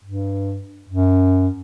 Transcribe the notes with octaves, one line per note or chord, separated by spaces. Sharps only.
G2
F#2